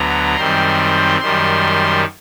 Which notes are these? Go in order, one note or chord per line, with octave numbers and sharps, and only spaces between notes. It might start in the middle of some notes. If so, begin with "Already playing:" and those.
Already playing: D2 D3 F#3 B3 A#5
F#2 D#3 G3 C4 C6
F#2 D#3 G3 C6